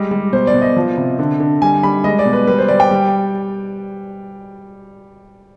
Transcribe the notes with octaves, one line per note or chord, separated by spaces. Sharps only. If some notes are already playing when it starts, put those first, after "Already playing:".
Already playing: G3 G#3 D#5
G3
B2 C5
D5
B2
D#5
F3
C3
D3
D3
G3 G#5
G3 B5
G#3 D#5
D5
B2
B4
G3 B4
C5
G3 D5
G5
G3